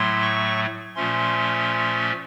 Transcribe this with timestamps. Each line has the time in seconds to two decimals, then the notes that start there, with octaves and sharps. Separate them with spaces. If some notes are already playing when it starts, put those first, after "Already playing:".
Already playing: A2 F#3 A3 C6
0.22 C#6
0.95 A#2 F3 A3 C#4 C6